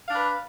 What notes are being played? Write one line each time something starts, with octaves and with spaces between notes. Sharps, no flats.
D4 B4 F5